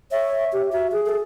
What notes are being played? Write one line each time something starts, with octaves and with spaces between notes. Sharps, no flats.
C#5 E5
G4
F#4 E5
G#4
A4